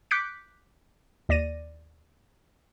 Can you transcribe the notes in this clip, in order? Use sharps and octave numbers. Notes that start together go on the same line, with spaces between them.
D6 F#6 G6 B6 C#7 D7
D#2 D5 A#6 D#7